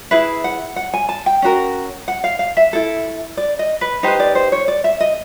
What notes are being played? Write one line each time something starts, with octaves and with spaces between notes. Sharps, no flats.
E4 G#4 B4 E5
F#5
F#5
G#5
A5
G5
C#4 F#4 A#4
F#5
F5
F5
E5
E4 A4
D5
D#5
B4
D#4 G4 B4 C5
D5
C5
C#5
D5
E5
D#5